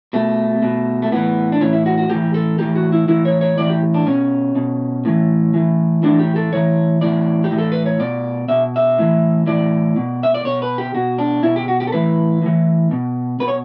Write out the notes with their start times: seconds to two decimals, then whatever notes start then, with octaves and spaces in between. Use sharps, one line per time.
0.13 B2 A3
0.62 B2
1.02 A3
1.12 A2 E3 B3
1.52 D4
1.61 A2 E3 C#4
1.73 E4
1.86 F#4
1.98 F#4
2.09 A2 E3 G4
2.34 A4
2.59 A2 E3 G4
2.76 F#4
2.92 E4
3.08 A2 E3 E4
3.25 C#5
3.41 C#5
3.57 A2 E3 D5
3.69 G4
3.94 D4
4.07 B2 C#4
4.55 B2
5.05 A2 E3
5.54 A2 E3
6.03 A2 E3 D4
6.19 G4
6.36 A4
6.52 A2 E3 C#5
7.01 A2 E3 D5
7.44 G4
7.50 A2 E3
7.58 A4
7.72 B4
7.86 C#5
8.00 B2 D5
8.48 B2 E5
8.76 E5
8.98 A2 E3
9.46 A2 E3 D5
9.96 B2
10.23 E5
10.34 D5
10.45 B2 C#5
10.62 B4
10.78 G4
10.95 B2 F#4
11.18 D4
11.43 B2 E4
11.56 G4
11.68 F#4
11.80 G4
11.87 A4
11.92 A2 E3 B4
12.42 A2 E3
12.91 B2
13.40 B2 B4
13.48 C#5